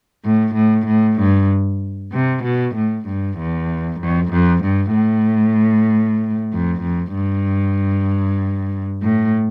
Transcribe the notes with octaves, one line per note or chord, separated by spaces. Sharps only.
A2
A2
A2
G2
C3
B2
A2
G2
E2
F2
F2
G2
A2
F2
F2
G2
A2